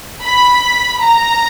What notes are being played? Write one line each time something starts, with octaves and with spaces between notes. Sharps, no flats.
B5
A#5